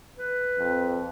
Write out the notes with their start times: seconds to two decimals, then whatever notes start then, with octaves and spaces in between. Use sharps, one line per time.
0.17 B4
0.59 F2